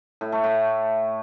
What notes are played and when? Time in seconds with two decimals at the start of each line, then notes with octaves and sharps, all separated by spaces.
0.21 A2
0.32 A3
0.44 A2